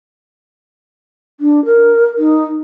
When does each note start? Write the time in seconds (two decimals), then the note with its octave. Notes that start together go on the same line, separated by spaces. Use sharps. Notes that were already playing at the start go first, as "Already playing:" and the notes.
1.40 D4
1.65 A#4
2.18 D#4